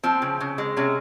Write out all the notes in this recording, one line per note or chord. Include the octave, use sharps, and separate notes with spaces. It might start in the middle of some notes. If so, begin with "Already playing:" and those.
F3 C4
C#3
C#3
G#3
C3 C#4